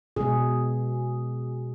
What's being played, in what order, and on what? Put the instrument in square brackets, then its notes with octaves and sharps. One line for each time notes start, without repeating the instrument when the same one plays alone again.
[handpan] B2 G#3 G#4